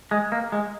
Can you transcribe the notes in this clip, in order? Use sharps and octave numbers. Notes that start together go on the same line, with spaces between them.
G#3
A#3
G#3